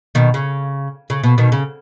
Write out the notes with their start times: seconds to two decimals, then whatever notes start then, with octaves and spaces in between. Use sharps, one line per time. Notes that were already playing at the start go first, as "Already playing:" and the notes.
0.15 B2 D#3
0.34 C#3
1.10 C#3
1.23 B2
1.38 B2 D#3
1.52 C#3